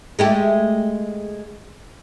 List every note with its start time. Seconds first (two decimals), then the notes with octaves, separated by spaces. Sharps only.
0.19 G#3 A3 G4